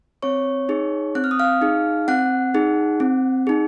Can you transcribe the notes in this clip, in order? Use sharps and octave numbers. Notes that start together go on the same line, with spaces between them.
C4 C#5 C#6
D#4 G#4
C4 F#6
F6
D#6
F5 F6
D#4 G#4
C4 F#5 F#6
D#4 G#4
C4
D#4 G#4